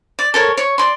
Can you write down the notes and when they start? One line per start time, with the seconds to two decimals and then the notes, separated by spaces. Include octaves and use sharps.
0.19 D5
0.34 A4 A#4 C#5
0.57 C#5
0.78 D5 C6